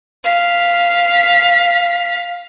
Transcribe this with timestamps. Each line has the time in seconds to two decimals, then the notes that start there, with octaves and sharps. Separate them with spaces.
0.24 F5 B6